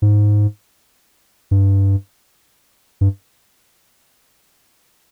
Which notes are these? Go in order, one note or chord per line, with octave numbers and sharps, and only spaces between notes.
G#2
G2
G2